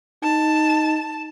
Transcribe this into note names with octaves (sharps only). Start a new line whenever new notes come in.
D#4 A5